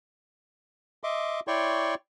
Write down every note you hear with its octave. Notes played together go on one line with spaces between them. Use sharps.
D#5 E5 C6 D6
E4 C#5 D5 G5 C6 C#6